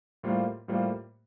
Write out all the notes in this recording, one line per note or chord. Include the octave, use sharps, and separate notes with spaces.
A2 G3 A#3 F4 C5
A2 G3 A#3 F4 C5